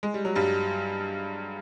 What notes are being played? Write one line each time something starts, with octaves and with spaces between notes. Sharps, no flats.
G#3
G3
F#3
G2 G3